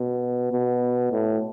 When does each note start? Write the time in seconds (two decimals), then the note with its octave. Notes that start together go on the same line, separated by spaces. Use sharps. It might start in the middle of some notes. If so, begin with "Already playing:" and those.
Already playing: B2
0.52 B2
1.12 A2